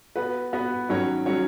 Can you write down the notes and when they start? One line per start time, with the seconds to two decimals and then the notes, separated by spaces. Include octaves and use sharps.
0.16 B3 F#4 B4
0.53 B3 F#4 B4
0.89 D#3 F#3 C#4 F#4 C#5
1.26 D#3 F#3 C#4 F#4 C#5